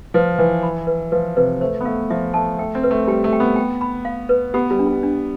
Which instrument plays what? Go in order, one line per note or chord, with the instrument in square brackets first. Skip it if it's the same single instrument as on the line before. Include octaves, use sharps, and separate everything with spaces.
[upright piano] F3 [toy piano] B4
[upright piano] E3 [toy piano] B4
[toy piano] B5
B4
[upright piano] F3 [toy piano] B4
[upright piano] C3 [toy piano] B4
[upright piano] A3 [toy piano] C5
[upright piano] B3
[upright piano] A3 [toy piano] F5
[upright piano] F3 [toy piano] E5
[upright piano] A3 [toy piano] A5
[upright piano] A3 [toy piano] G5
[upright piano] C4
[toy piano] B4
[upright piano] A3
[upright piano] G3 [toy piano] G5
[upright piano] A3
[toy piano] G5
[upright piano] B3
[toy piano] G5
B5
F5
B4
[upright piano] B3 [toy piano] G4
[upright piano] G3
[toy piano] D4
[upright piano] G3
[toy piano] D4